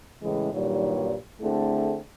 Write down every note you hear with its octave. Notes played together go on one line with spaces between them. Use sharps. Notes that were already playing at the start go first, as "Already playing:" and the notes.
A2 C#3 E3 G#3
G2 A#2 D#3 F#3 G3
D3 A3 C4 E4 G#4